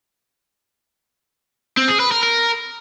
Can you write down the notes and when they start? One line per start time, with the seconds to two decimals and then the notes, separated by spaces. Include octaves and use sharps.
1.77 C4
1.89 G#4
2.00 B4
2.11 A#4
2.23 A#4